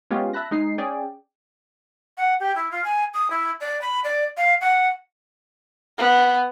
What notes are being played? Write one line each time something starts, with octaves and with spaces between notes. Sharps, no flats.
G#3 B3 C#4 F4 G4
E5 A5 B5 F#6 A#6
G#3 D#4 C7
C#4 G#4 D5 G5
F#5
G4
E4
F4
G#5
D#6
E4
D5
B5
D5
F5
F#5
B3